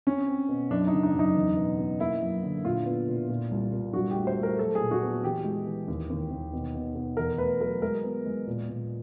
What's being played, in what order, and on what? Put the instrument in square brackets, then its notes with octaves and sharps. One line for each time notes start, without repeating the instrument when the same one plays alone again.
[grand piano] C4 C#4
C4
B2
F#2 D4
D#4
C#3
D#4
F#2 D#4
E2
B2
B2
A#3 E4
F#2
D3
A#2 F4
B3
A#2
A#2
C2
A#2
G2 F#4
A3 G4
C5
A3
A#4
F#3 A4
G#4
A#2
F#4
B3
E3 G4
G#3
E3
D#2
D#2
D#2
B2
B2
B2
E2 A#4
A3 B4
F#3 A#4
G#3 A#4
B3
G#3
A#2
A#2